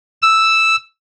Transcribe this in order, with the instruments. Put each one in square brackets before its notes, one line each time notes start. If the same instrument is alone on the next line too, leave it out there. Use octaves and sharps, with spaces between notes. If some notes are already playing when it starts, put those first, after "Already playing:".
[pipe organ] E6